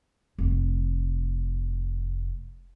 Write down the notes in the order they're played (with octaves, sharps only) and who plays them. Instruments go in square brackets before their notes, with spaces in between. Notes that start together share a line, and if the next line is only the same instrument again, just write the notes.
[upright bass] F1 A3